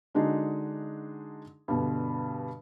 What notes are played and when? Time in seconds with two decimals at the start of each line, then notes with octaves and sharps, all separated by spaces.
0.15 D3 G#3 D4 D#4 F#4 G#4
1.68 G2 B2 D3